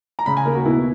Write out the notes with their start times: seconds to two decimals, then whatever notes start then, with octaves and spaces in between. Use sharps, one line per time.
0.19 A#5
0.26 C#3 B5
0.37 G#5
0.45 D#2 A#4
0.55 F#4
0.65 B2 E4